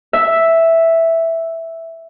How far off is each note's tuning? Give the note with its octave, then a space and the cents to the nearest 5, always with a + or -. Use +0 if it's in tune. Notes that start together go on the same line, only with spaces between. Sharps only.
E5 +0